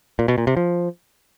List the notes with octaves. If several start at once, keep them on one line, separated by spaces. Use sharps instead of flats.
A#2
B2
A#2
C3
F3